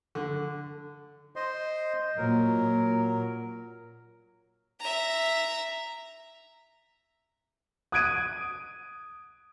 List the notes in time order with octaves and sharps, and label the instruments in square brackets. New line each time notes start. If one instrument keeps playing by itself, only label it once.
[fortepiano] D3
[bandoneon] C5 D#5 C6
[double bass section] A#2 [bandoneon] F#3 A#4
[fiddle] E5 A#5
[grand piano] D#6 F#6 G#6 D7 D#7